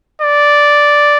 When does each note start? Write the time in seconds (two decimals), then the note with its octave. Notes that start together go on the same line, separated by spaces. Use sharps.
0.22 D5